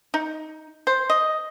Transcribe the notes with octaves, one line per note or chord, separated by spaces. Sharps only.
D#4
C5
D#5